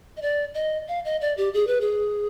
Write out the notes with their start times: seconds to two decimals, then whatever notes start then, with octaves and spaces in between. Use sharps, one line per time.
0.17 D#5
0.22 D5
0.54 D#5
0.88 F5
1.05 D#5
1.21 D5
1.37 G4
1.54 G#4
1.67 B4
1.81 G#4